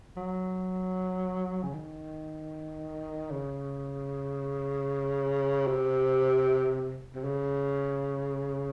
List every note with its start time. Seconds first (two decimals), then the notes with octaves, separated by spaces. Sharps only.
0.17 F#3
1.63 C#3
1.74 D#3
3.31 C#3
5.67 C3
7.15 C3
7.24 C#3